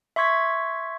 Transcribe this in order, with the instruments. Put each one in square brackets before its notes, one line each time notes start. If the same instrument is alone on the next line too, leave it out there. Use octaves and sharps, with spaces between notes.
[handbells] E5 C6 C#6 G#6 B6